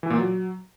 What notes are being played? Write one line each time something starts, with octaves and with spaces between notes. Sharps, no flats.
E3
A#2
F#3